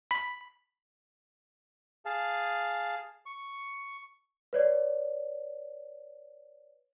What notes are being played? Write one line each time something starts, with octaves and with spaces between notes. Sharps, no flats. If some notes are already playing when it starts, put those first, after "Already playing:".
B5
G#4 F5 A5
C#6
B4 C#5 D5